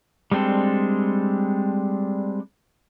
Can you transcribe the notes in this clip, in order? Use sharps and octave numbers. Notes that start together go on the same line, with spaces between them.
G3 G#3 C4 D4 A4